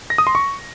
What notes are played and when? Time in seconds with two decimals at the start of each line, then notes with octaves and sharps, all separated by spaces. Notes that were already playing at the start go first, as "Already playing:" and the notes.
0.10 A#6
0.18 D#6
0.27 C6
0.35 C#6